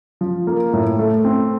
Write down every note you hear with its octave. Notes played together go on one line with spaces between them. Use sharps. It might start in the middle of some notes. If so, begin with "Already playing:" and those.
F3
A#3
A2
A3
C4